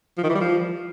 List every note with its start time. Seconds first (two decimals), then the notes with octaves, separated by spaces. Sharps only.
0.18 F3
0.24 D#3
0.29 E3
0.35 G3
0.41 F3